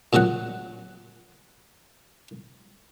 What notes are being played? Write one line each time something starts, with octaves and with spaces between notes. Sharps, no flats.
A#2 C#3 F3 F#3 F#5